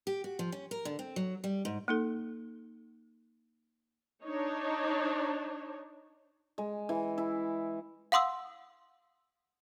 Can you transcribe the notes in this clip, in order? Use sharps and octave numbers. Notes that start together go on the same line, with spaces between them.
G4
F#4
F3
C#4
A#4
D3
C4
F#3
G3
G#2
A#3 D#4 A4
D4 D#4 C#5
G#3
E3
E4
F5 F#5 C6 D#6 E6